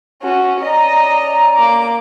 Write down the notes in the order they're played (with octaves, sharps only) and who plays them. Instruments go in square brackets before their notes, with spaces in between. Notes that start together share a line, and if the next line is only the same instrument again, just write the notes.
[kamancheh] C#4 F#4
[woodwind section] C#4 D5 A#5 [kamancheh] D#5
[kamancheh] A#3 D6